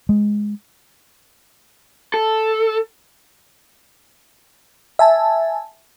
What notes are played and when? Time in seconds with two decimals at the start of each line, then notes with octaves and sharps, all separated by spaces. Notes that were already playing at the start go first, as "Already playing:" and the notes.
0.09 G#3
2.14 A4
4.99 E5 G#5 A5